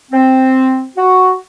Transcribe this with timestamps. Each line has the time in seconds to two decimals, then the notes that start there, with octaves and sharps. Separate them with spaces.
0.12 C4
0.96 F#4